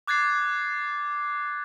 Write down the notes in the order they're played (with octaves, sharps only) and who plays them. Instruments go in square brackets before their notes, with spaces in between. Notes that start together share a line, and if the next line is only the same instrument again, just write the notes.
[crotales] D6 F#6 G#6 A6 C7